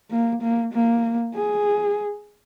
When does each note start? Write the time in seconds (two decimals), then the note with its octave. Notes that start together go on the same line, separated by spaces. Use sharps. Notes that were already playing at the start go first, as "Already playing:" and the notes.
0.11 A#3
0.42 A#3
0.74 A#3
1.35 G#4